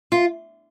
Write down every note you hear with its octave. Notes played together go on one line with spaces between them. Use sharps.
F4